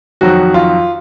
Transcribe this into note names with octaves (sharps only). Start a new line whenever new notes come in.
F2 D#3 F#3 F#4
F4